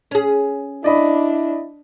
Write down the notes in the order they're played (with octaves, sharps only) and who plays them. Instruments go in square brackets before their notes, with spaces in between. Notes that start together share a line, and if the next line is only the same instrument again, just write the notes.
[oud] C#4 G#4
[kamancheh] D4 [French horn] E4 [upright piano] D5 D#5 B5